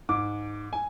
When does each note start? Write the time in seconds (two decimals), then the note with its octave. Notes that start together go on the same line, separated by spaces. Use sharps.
0.09 G#2 D6
0.73 G#5